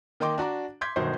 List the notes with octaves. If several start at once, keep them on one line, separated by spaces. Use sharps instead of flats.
D#3 A#3 D#5 G5 C6 D6
D4 F#4 A#5 D6
C6 D6 G6 G#6 B6
G1 B2 D#3 F#3 C5